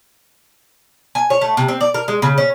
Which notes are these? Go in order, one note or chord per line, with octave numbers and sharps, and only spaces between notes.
G#5
C#5
A3
C3
C4
D5
A#4
G#3
C#3
C#4